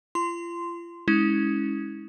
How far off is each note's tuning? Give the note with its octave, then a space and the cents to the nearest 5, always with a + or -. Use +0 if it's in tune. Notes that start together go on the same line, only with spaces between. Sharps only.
F4 -35 C6 -10
G#3 +0 C#4 +0 E4 -35